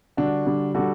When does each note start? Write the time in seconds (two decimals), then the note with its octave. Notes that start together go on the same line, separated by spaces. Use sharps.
0.17 D3 G3 D4 F#4
0.46 D3 G3
0.74 D3 G3 F#4 A4